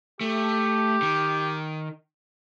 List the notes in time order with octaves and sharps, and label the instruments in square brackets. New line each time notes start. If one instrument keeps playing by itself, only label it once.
[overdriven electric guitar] A3 [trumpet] G4
[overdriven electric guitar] D#3